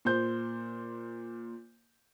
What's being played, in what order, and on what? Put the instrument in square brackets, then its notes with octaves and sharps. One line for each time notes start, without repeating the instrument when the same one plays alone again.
[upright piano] A#2 C5 G6